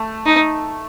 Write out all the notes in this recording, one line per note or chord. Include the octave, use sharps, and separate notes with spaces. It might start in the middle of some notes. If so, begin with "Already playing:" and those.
Already playing: A3
D#4